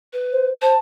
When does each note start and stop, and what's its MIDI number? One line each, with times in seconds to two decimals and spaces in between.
0.13 0.47 71
0.32 0.53 72
0.62 0.73 72
0.62 0.78 81